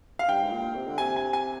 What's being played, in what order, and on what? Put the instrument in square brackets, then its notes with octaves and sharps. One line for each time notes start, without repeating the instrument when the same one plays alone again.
[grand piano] F5
[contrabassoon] G2 [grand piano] G5
[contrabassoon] G#2
A#2
C3
D3
[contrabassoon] C3 [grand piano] G#5
[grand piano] G#5
G#5